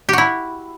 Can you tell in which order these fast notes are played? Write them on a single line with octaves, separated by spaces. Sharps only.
G4 F#4 E4